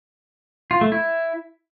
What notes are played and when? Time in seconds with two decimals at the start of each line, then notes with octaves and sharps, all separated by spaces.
0.71 F4
0.81 A3
0.92 E4